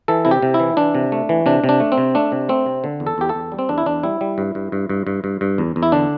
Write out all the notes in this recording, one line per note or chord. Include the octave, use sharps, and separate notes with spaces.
E3 A4
C3 E4
G4
C3
E4
E3
E3 D4
C3
A3
E3
C3 D4
C3
D4
A3
C4
C3
A3 D4
C3
A3 C4
C3
D3
E2
A4
E2 G4
A4
E2
G3
C4
E2 D4
E4
E2 D4
G3 E4
G3
G2
G2
G2
G2
G2
G2
G2
E2
E2
E4
D3 D4